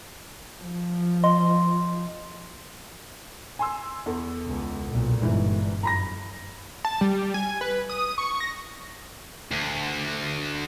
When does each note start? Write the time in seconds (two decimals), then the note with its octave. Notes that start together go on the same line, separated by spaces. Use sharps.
0.61 F3
1.24 D#5 C6
3.59 G#5 C6 E6
4.06 E2 A4
4.46 C#2
4.88 B1 A#2
5.22 G1 G#2 E3
5.83 F#2 A#5 B5 A#6
6.85 A5
7.01 G3
7.34 G#5
7.61 B4
7.90 D#6
8.18 C#6
8.40 A#6
9.52 D2